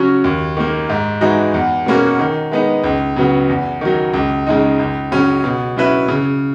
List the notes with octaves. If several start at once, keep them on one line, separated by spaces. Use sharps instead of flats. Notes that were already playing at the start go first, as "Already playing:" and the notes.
Already playing: C#3 F#3 C#4 F#4
D#2
D#3 A#3
G#2
E3 G#3 D#4 F#4
E2
B2 A#3 C#4 F#4
D#3
G#3 B3 D#4
C#2
C#3 F#3 B3
E2
D#3 F#3
C#2
C#3 G#3 D#4
C#2
C#3 F#3 C#4
B2
F#3 C#4 E4 B4
C#3